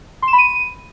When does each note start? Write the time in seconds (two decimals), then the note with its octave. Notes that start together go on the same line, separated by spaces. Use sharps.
0.22 C6
0.28 E7
0.33 B5
0.38 D#7